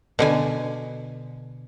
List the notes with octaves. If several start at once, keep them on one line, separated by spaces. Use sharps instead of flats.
B2 D3 G#5